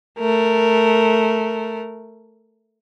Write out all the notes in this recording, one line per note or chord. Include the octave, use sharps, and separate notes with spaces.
A3 A#4